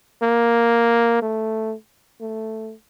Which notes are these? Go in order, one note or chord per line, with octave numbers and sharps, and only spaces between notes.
A#3
A3
A3